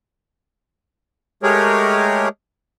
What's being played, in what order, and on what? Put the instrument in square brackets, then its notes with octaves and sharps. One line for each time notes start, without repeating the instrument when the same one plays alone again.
[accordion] G#3 A3 G4 G#4 A#4 C#5